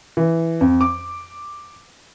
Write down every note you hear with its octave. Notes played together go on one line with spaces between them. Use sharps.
E3
F2
D6